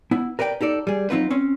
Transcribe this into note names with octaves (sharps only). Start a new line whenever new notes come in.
B3 E4
A#4 B4 D5 E5 G5
D#4 G4 A4 D5
G3 G#4
F#3 G3 C4 D#4 F4 B4
C4 C#4